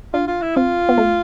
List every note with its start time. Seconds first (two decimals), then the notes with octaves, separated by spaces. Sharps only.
0.14 D4 F4
0.28 F4
0.42 E4
0.56 C4 F4
0.89 B3
0.98 A3